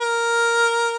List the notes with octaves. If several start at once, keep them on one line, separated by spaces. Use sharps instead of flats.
A#4